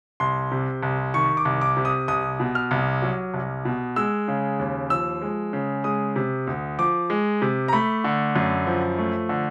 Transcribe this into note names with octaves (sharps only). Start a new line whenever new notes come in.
C2 C6
C3
C2
D#3 C#6
D6
C2
D6
C3
D#6
C2 D#6
B2
F6
C2
F#3
C2
B2
G#3 E6
C#3
D#2
F3 E6
G#3
C#3
G#3 D#6
C3
D2
F3 D6
G#3
C3
A#5
A3 B5
D3
F#2
F3
A3
D3